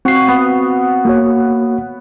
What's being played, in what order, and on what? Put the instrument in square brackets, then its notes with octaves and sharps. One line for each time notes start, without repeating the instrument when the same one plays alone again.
[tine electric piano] C4 C7 [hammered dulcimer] F#4 F5
[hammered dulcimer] B3
[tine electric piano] A#3 F#4 C#5